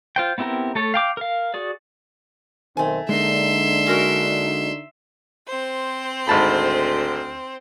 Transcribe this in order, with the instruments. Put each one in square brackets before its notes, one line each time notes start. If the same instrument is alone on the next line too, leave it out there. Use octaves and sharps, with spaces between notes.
[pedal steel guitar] F4 C5 G5
B3 C4 E4 G4 A#4
A3 A4 C#5
F5 G5 D6
A#4 F5
F#4 G#4 D5
[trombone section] B1 D#3 C4 [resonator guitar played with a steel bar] A3 G#5
[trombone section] D3 D4 D#4 [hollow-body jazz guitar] G#3 A#3 [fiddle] E5 C6
[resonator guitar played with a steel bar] C#4 F#4 A#4
[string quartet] C4 C5
[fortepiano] G#1 A5 B5 [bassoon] D2